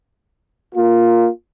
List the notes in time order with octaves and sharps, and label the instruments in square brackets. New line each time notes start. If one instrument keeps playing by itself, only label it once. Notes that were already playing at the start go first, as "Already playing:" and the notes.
[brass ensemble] A#3 F4